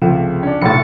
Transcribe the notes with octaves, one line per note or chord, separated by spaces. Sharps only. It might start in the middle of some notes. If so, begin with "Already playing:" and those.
C#2 C3 F3 A3
C#4 D4
F1 B1 A2 A6 C#7